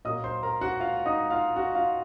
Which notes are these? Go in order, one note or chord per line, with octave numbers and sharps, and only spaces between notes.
A#2 F#3 A#3 D#5 D#6
C5 C6
A#4 A#5
F#4 F#5
F4 F5
D#4 D#5
F4 F5
F#4 F#5
F4 F5